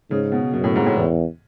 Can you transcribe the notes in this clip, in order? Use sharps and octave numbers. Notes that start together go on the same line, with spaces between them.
G#2 C#3
B2
F#2 B2
A2
G#2
A2
E2